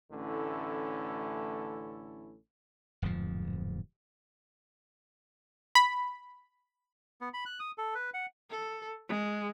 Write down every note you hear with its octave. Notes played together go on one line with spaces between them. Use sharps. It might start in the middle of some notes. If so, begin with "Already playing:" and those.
A1 D3 A3 C#4 E4 A4
D1 F2 G#2 F3
B5
B3
B5
F#6
D#6
A4
B4
F#5
A4
G#3